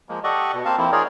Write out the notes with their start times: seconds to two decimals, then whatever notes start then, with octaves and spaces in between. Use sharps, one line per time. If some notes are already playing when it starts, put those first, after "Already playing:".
0.09 F3 G#3 A#3
0.24 G4 A4 D5 D#5 F#5 C#6
0.53 B2
0.65 A#3 C4 F5 A5
0.78 F2 F3 A#3 C4 E4
0.92 D#4 F4 G#4 A#4 C#5 D5